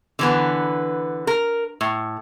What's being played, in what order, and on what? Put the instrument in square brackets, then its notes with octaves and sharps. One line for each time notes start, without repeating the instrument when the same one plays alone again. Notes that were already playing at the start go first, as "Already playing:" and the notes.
[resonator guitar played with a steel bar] D3 E3 B3
A#4
A2